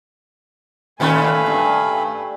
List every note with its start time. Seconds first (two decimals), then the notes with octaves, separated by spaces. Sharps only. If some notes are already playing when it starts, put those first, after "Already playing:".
1.00 A2 D#3 A3 C#4 F5 G#5 B5
1.46 G2